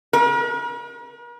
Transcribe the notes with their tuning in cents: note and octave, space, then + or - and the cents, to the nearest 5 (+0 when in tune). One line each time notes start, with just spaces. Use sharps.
A#4 +45